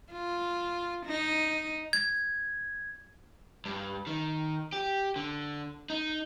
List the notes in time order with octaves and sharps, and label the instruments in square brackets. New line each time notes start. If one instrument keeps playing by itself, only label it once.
[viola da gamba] F4
D#4
[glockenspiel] G#6
[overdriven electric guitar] G2
D#3
G4
D3
D#4